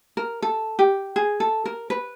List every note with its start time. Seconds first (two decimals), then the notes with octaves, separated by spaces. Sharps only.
0.17 A#4
0.42 A4
0.79 G4
1.16 G#4
1.40 A4
1.65 A#4
1.90 B4